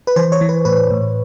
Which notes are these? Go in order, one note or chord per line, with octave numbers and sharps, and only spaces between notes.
B4
E3 C5
C#5
E3
B4
A2 B4
A2